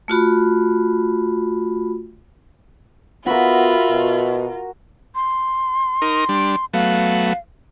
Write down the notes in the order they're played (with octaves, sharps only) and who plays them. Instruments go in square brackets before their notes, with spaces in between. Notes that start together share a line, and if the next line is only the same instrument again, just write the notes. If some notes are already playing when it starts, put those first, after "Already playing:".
[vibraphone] A3 F4 F#4 B5
[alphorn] B3 [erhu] F4 [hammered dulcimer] F#4 A#4 [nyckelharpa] E5 B5
[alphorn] B2
[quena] C6
[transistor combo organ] D#4 A#4
G3 D4
[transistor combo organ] F#3 A3 B3 [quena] F5